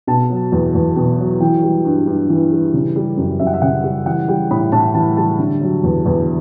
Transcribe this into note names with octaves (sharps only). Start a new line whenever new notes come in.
B2 A5
F#3
E2
E2
B2
F#3
E3 G5
G3
G2
G2
E3
G3
C#3
G3
F#2
F#2 E5
F#5
E5
C#3 F#5
G3
E3 F#5
G3 G5
A2 B5
A2 A5
E3 A5
G3 A5
D3
F#3
E2
E2